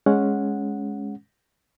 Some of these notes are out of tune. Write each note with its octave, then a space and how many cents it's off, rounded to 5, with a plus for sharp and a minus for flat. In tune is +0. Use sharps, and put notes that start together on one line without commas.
G#3 +0 C#4 +0 F#5 -10